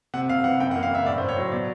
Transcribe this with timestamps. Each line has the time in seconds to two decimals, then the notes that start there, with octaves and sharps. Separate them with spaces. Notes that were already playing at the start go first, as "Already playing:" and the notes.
0.14 C3 F#5
0.29 C3 F5
0.44 E3 F#5
0.60 F#2 G5
0.71 F#5
0.76 A#3
0.83 F5
0.90 C#3 E5
1.06 A2 D5
1.18 C5
1.21 A2
1.29 C#5
1.37 F#3 C5
1.52 B2 D5